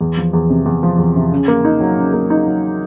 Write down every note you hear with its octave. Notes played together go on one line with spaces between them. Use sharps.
E2
F3
E2
C3
E2
F3
E2
C3
C#3
A#3
D#4
F#3
C#3
A#3
D#4
F#3